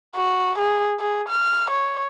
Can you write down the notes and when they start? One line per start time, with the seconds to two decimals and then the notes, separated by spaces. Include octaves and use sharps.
0.15 F#4
0.58 G#4
1.00 G#4
1.29 F6
1.70 C#5